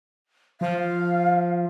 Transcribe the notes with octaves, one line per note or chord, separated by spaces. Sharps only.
F3 F5